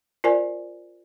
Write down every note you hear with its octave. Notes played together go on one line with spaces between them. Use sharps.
F4 A#4 C5 D5 G#5